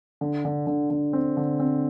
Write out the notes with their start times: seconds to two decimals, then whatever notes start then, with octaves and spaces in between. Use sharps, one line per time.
0.21 D3
0.45 D3
0.67 D3
0.90 D3
1.13 C4
1.37 D3
1.60 C4